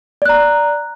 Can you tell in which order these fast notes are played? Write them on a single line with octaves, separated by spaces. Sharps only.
D5 F#6 A#5